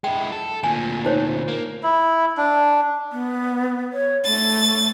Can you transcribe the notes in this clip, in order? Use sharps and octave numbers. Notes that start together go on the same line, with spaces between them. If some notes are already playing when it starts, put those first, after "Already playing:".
G#3 E4 G5
A4
D2 A#2 G#5
D#4 C5 C#5
A#3
E4
D4
B3
C#5
A3 A6